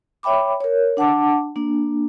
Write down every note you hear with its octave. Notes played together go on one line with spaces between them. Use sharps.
C#5 E5 G5 B5 D6
A#4 C#5
D4 F#5 A5 D6
A#3 D4